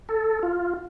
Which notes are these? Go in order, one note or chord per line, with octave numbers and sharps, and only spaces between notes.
A4
F4